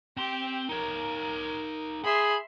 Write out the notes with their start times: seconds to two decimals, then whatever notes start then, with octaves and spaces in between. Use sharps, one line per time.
0.17 C4 G4 C6
0.69 D#4 A#4 C#5
2.05 G#4 E5 B5 C6